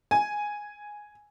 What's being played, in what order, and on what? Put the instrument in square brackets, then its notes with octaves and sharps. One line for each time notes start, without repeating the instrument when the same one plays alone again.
[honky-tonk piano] G#5